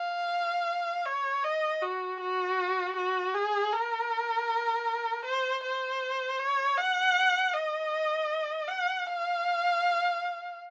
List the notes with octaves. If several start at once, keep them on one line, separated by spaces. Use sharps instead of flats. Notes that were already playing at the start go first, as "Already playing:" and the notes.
Already playing: F5
C#5
D#5
F#4
F#4
F#4
G#4
A#4
C5
C5
C#5
F#5
D#5
F#5
F5